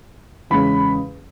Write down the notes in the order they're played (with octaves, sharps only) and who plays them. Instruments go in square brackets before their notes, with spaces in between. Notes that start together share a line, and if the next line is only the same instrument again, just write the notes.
[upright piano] E2 C#3 G#3 C#4 B5